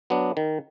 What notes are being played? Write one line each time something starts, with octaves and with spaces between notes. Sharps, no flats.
F#3 B3 D4
D#3